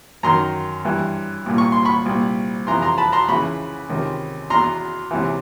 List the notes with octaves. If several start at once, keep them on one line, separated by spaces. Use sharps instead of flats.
F#2 D#3 A#5 C6
G2 E3
C2 A#2
C#6
C6
B5 C#6
C2 A#2
F2 C3 E3 A#5 C6
A#5 C6
A5 B5
A#5 C6
C#2 C#3 E3 B5 C#6
C#2 C3 D#3
E2 B2 A#5 C6
C#2 C3 E3